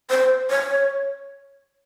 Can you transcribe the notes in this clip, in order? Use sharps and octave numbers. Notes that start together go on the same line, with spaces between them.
C5
C#5